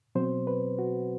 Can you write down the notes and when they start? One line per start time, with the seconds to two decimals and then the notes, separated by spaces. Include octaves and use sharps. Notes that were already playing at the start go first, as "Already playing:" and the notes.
0.15 B2 F#3 C4 C5
0.47 B4
0.79 F#4